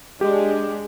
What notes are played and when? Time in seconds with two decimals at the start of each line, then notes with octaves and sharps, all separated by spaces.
0.21 G#3 D4 G4